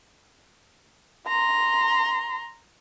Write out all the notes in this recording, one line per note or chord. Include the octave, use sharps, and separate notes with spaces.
A#5 C6